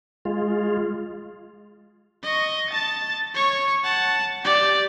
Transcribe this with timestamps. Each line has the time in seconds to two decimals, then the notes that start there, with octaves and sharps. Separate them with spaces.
0.25 G#3 F4
2.24 D#5 C#6
2.70 A5 A6
3.34 C#5 C#6
3.84 F#5 A5
4.43 G4 D5